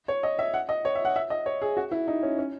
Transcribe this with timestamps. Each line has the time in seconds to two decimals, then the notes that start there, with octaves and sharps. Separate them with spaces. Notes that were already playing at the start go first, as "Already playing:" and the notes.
0.08 C#5
0.23 D#5
0.39 E5
0.54 F#5
0.69 D#5
0.85 C#5
0.95 E5
1.05 F#5
1.16 E5
1.30 D#5
1.46 C#5
1.62 G#4
1.77 F#4
1.91 E4
2.08 D#4
2.23 C#4
2.38 C#4